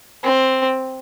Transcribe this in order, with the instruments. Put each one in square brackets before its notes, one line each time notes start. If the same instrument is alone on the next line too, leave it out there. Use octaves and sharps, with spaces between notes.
[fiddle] C4